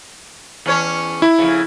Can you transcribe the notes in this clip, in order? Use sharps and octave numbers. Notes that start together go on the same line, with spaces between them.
E2 C#4 C#5
E4
F2 C#3